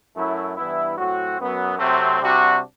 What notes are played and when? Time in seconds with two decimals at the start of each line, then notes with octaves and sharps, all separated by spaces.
0.15 F#2 F#3 A3 E4
0.56 G2 E3 B3 E4
0.97 A2 F#3 C4 F#4
1.38 F#2 F#3 B3
1.79 C3 F#3 A3 C4
2.21 C3 G3 D4 F#4